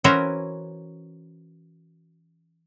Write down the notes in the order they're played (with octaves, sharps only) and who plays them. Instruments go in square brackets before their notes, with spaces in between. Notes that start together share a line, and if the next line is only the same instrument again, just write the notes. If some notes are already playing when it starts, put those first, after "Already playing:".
[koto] E3 C#4 F#4 A#4 C5 E5